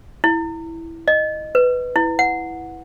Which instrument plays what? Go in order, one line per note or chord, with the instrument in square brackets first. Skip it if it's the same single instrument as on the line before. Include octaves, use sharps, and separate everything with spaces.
[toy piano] E4
D#5
B4
E4
F#5